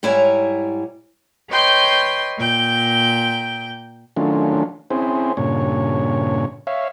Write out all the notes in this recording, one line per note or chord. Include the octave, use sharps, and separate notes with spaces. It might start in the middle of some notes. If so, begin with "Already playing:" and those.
G#2 G3 E4 C#5 G#5 A#5
B4 C#5 D#5 G5 C6 G6
A#2 G5 G6
D#3 F#3 A3 C#4 D4 F4
C4 C#4 E4 G#4 C5
G2 A#2 C#3 C#5
C#5 E5 F5